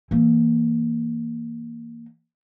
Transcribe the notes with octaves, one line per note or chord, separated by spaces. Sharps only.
E3 A#3